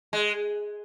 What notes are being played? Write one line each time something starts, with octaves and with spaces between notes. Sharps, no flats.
G#3